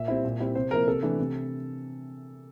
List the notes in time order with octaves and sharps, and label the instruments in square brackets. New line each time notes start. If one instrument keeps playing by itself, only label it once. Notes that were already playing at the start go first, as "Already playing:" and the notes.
Already playing: [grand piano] A#2 E5
G3 C4 E4
A#2
G3 C4 E4
C3 C5
F3 A#3 E4 A#4
C3 A4
E3 A3 D4
C3